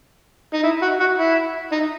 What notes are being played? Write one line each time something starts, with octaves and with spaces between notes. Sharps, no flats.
D#4
E4
F#4
F#4
E4
D#4